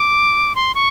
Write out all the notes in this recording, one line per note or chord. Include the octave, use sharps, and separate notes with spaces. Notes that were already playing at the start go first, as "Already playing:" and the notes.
Already playing: D6
C6
C#6